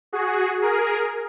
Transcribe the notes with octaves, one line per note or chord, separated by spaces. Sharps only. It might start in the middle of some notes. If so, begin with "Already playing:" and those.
F#4 G#4
G#4 A#4